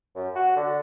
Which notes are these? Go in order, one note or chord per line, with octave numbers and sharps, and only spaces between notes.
F#2
F#4
D3